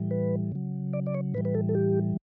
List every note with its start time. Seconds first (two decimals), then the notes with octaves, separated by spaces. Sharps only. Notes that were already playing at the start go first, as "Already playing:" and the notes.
Already playing: A2 E3 G3
0.11 B4
0.52 C#3 F#3
0.93 D5
1.07 D5
1.14 C#5
1.34 A2 E3 G3 B4
1.45 B4
1.55 A4
1.69 A4
1.75 G4